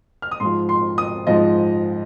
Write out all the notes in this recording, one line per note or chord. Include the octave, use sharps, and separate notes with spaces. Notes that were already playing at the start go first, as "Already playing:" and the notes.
F6
D#6
G#2 F3 C6
C6
D#6
G#2 F3 D#5